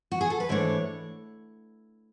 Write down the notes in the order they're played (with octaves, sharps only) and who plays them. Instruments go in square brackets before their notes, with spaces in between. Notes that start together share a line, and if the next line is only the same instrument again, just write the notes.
[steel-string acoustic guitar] F#4
G#4
A4
B4
G#2 E3 A3 D4 C#5